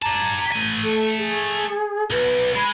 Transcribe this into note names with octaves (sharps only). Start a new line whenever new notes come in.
G4 A5 A#5
A3 G#5
A4
G#4
B1 B4
G#3 B5